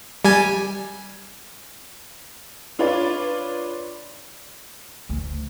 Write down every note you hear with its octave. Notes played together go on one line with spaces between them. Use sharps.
G3 G#5
D4 F4 B4 C#5 D5
D2